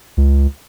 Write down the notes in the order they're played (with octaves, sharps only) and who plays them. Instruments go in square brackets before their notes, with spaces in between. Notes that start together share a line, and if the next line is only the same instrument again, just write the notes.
[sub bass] C#2